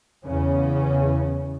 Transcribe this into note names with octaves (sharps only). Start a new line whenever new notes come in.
E2 C#3 C#4